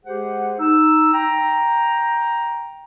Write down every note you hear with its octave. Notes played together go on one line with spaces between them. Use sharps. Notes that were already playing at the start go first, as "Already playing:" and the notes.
G#3 G4 G#4 C5 F#5
D#4 E6
G5 A#5